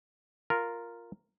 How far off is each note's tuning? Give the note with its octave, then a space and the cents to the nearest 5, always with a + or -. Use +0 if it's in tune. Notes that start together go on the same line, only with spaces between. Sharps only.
F4 +0 A#4 -5